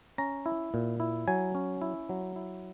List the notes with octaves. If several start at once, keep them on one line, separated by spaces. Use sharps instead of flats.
C#4 A#5
E4
A#2
E4
F#3 G#5
C#4
E4
F#3
E4